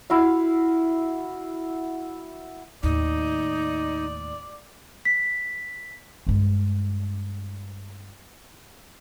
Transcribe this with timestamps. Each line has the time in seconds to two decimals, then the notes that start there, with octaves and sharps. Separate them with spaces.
0.10 E4 F#4 F5
2.83 D#2 A2 D#4 D5
5.05 B6
6.27 G2 G#3